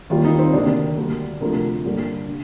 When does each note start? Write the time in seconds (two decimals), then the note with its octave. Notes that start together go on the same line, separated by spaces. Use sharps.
0.10 D#2 D#3 G3 A#3 F4
0.25 D#4
0.39 C4
0.53 D2 C3 D#3 A#3 D4
0.97 D2 D3 G3 A#3
1.41 D2 C3 F3 A3 A#4
1.84 G1 G2 D3 G3 A#3
2.29 D3